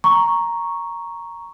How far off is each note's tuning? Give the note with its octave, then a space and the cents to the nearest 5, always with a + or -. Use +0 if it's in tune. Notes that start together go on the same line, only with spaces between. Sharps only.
A#5 +0 C#6 +0